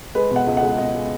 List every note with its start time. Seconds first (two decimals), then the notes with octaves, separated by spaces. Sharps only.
0.15 G#3 B4
0.31 B2
0.36 F#5
0.47 C#2
0.57 F#5
0.63 G#3
0.78 B2 D#5
0.94 G#3